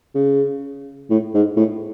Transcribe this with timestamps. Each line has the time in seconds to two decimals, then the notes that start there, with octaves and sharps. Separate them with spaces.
0.15 C#3
1.10 A2
1.34 G#2
1.57 A2